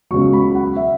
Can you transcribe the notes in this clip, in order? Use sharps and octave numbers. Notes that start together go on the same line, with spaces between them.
C#2 B2 F#3 C#6
B5
F#5
E5